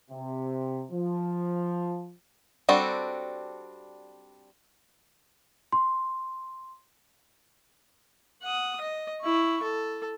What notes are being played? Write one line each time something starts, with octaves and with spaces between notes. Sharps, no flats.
C3
F3
G3 C4 D4 F#4 A4
C6
F#5 D#6
D#5
E4 C#6
A4